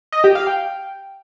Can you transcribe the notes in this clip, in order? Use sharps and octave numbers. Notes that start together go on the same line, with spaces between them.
D#5
G4
F5
G5